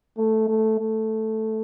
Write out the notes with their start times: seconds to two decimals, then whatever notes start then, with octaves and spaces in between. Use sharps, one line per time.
0.18 A3
0.49 A3
0.80 A3